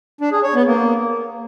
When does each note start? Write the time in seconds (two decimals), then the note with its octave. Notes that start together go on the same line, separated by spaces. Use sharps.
0.21 D4
0.32 G#4
0.43 C#5
0.55 B3
0.66 A#3